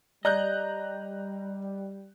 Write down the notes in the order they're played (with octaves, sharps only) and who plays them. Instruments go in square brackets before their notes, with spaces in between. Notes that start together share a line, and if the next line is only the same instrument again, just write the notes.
[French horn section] G3 [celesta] D5 [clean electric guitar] D#5 [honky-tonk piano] A#5 F#6 G6